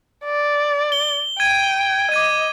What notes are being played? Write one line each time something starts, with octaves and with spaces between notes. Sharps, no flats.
D5
G7
G5 G#6 D#7
D#5 D6 G#6 D#7